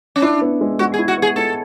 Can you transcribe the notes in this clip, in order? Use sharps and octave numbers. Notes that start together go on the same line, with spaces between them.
C#4
D4 E4
B3
G#3
G#3 F#4
G#4
E4
F#4
B3 G#4
G#3 A4